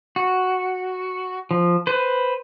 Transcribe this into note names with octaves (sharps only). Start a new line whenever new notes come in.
F#4
F3
B4 C5